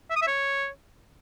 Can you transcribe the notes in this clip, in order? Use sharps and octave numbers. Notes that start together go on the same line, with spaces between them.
E5
D#6
E5
C#5